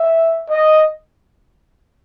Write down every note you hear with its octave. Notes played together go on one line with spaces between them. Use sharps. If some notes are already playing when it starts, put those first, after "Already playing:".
Already playing: E5
D#5